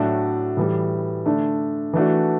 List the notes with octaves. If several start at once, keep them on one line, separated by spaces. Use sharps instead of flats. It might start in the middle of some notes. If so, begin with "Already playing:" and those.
Already playing: A2 F#3 A3 D4 F#4
A2 E3 G3
D3 A3 D4
E3 A3 D4 F#4